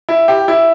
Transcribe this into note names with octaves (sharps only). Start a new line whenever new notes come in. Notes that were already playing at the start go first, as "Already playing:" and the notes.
E4
G4
E4